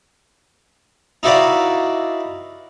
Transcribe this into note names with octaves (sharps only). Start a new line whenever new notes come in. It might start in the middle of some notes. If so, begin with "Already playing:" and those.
D#4 E4 F#4 B4 D5 F5